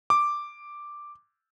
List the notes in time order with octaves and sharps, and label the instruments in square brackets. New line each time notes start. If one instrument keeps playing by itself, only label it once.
[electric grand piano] D6